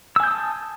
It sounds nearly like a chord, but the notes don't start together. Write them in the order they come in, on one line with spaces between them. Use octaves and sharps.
E6 G#5 G6 D#6 A5